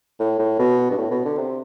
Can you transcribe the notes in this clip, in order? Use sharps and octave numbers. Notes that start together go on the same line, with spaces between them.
A2
A2
B2
G2
A2
B2
D3
C3